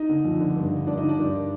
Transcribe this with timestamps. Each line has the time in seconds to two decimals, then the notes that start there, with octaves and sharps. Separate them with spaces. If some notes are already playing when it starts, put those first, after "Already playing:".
Already playing: D#4
0.09 D3
0.24 F2
0.40 D3
0.56 G2
0.72 D3
0.87 G2 D4
0.98 D#4
1.03 D3
1.09 D4
1.18 G2
1.34 D#3